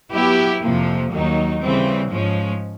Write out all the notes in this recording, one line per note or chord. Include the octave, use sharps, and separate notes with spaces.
F#3 B3 E4 G4
F2 C3 F3 A#3
D#2 D#3 F#3 A#3 D#4
C#3 E3 G3 C4
G#2 F3 G#3 C#4